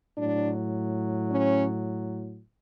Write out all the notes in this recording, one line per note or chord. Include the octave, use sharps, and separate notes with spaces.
A2 F#3 D4
C#4